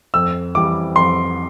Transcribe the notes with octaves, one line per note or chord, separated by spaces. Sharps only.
F2 E6
E3 G3 D6
F2 C6